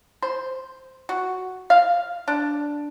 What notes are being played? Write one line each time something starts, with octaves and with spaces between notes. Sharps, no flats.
C5
F#4
F5
D4